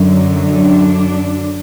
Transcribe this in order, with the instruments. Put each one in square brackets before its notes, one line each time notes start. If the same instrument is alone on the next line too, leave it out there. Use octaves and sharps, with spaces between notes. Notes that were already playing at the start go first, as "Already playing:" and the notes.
Already playing: [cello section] F#2 D3 F#3
D4